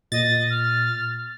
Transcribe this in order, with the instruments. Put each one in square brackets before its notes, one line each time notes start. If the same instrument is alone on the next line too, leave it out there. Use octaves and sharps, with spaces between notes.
[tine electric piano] A#2 [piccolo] D#5 [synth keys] A6
[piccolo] F6